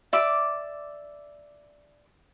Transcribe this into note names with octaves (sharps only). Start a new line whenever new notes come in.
D5 E5 D6